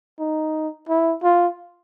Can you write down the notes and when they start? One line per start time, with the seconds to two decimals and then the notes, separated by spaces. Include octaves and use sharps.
0.20 D#4
0.89 E4
1.23 F4